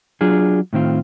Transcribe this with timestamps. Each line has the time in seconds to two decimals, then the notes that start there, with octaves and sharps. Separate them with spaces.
0.21 F#3 D4 F4 G#4
0.73 A2 D#3 C4 F4